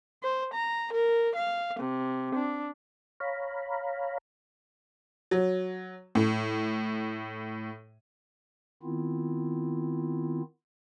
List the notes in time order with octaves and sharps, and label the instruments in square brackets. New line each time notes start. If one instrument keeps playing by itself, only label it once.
[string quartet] C5
A#5
A#4
F5
C3
D4
[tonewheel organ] C#5 F5 A#5 B5
[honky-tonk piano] F#3
A2
[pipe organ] D#3 B3 C4 E4 F4